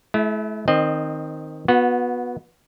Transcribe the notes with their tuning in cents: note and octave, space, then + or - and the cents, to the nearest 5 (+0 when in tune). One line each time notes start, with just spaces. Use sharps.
A3 -45 E4 +0
D#3 +0 C4 +0 D#5 -25
B3 -10 F#4 -35